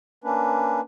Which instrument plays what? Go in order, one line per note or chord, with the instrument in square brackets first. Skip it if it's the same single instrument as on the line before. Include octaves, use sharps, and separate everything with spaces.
[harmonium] A#3 C#4 D4 B4